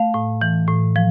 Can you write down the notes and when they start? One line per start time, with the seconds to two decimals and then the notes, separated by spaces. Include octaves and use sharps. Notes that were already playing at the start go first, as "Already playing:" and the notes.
Already playing: A3 F5
0.14 A2
0.41 E3
0.68 A2
0.96 F3